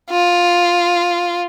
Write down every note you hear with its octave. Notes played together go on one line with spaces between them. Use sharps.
F4